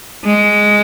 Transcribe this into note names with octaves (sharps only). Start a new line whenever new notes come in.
G#3